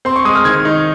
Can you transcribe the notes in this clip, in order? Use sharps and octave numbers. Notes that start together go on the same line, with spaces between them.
C4 C6
C#6
G#3 D#6
F6
D#3 G#6
D#4